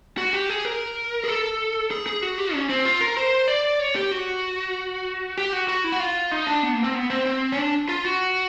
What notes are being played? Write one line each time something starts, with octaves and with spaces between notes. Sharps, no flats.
F#4
G4
G#4
A#4
G#4
A4
G#4
G#4
F#4
G4
C#4
C4
F4
A#4
C5
D5
C#5
G4
F#4
G4
F#4
F#4
E4
F#4
F4
D#4
D4
B3
A#3
C4
B3
C4
C4
C#4
D4
F4
F#4